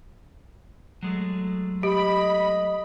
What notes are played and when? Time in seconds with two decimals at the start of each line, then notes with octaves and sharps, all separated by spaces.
1.03 F#3 G#3 A3
1.83 G4 D#5 B5